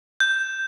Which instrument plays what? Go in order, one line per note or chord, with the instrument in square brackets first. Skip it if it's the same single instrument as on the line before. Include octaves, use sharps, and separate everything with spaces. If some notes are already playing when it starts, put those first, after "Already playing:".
[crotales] G6